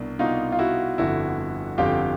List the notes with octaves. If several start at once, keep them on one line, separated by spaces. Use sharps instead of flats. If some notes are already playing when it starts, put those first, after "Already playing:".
Already playing: C2 B2 D4
C2 B2 D#4 F4
F4
E4 F#4
G1 F2 D3 E4 F#4
G1 F2 D3 F4 G4